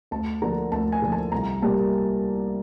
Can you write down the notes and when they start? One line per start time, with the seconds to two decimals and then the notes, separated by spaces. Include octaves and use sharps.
0.11 D2 A5
0.42 D3 F3 A#3 A#5
0.72 D2 A5
0.92 G#5
1.02 D3 F3 A#3
1.12 A5
1.32 C2 A#5
1.62 A#2 G3 A#3 A5